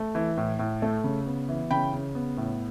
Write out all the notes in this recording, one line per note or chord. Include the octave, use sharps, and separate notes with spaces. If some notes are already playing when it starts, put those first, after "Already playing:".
Already playing: A3
E3
A2
A2
A3
C#3
B3
E3
C#3 G5 B5
C#3
B3
A2